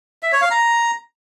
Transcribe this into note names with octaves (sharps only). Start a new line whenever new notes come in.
E5
C#5
F5
A#5